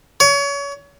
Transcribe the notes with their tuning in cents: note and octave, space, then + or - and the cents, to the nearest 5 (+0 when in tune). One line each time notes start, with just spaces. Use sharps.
C#5 +30